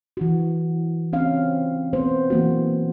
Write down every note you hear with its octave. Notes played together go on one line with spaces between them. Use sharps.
E3 F#4
C4 C#4 F5
B3 C4 C5
E3 A#3 F#4